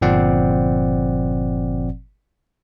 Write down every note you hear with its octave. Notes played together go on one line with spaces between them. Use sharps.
G1 A#2 F3 C4 D5 F#5